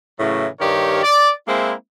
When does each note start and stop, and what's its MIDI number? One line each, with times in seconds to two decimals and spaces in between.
0.19 0.46 45
0.19 0.46 49
0.19 0.46 52
0.19 0.46 54
0.19 0.46 57
0.60 1.02 43
0.60 1.02 51
0.60 1.02 67
0.60 1.02 70
0.60 1.02 73
1.03 1.30 74
1.47 1.72 56
1.47 1.72 58
1.47 1.72 60
1.47 1.72 64